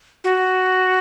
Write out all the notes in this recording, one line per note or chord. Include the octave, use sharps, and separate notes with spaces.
F#4